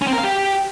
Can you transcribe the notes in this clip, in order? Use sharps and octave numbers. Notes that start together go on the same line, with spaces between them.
C#4
C4
A#4
F5
G4